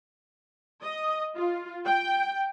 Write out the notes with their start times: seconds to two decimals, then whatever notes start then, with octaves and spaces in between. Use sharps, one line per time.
0.83 D#5
1.36 F4
1.86 G5